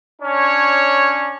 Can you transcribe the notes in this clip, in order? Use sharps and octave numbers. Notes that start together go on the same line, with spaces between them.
C#4 D4 C#5